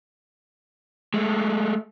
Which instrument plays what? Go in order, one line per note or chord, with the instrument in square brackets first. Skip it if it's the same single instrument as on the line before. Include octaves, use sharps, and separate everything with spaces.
[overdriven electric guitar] G#3 A3